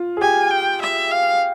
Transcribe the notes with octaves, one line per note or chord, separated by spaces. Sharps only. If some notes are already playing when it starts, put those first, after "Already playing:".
Already playing: F4
G#4
G4 G#5
G5
E5
F5